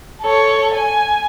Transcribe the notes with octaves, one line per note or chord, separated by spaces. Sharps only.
A4 C#5
G#5